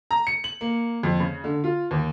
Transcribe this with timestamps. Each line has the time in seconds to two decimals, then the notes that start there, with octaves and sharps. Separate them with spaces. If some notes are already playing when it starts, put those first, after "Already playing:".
0.11 A#5
0.27 C#7
0.44 F#7
0.61 A#3
1.03 F2
1.20 C#3
1.44 D3
1.64 F4
1.91 D#2